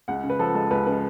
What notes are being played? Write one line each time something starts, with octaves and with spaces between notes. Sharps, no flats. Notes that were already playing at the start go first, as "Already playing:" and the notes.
C#2 F#5
C#3
B4
F3 A4
G#3 A4
C#2 B4
C#3 B4